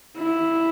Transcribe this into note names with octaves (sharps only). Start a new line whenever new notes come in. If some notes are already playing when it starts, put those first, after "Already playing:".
E4